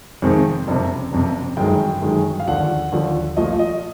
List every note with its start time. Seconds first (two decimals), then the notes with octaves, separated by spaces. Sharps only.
0.22 F2 C3 D#3 G#3 C4
0.67 F#1 F2 C3
1.12 F#1 F2 C3
1.57 G1 F#2 D#3 G#3 G5
2.02 G1 F#2 D#3 G#3
2.40 F5
2.47 D#2 D3 F3 F#5
2.92 D#2 D3 F3
3.37 A#1 A#2 F3 A3 D#5
3.59 D#5